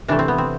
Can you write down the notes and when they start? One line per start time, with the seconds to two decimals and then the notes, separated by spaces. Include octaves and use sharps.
0.08 C3 E3 A3 D4
0.19 C4
0.28 B3
0.38 C4